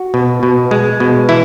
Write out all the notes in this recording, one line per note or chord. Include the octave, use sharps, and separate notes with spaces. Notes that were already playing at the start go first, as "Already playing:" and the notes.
Already playing: F#4
B2
B2
G#3
B2
E3 E4